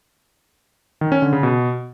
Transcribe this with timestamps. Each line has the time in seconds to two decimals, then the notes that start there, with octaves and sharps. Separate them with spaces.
1.01 D#3
1.12 C#4
1.22 D3
1.33 C#3
1.43 B2